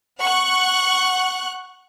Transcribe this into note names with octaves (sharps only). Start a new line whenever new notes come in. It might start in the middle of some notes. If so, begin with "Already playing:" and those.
F#5 C#6 F#6